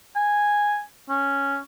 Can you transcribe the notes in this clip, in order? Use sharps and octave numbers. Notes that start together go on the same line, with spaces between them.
G#5
C#4